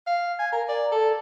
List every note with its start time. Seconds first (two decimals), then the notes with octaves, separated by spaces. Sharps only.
0.07 F5
0.39 G#5
0.52 A#4
0.68 D5
0.92 A4